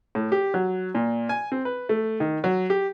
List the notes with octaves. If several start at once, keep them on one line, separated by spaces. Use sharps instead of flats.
A2
G4
F#3
A#2
G#5
C4
B4
A3
D#3
F#3
G4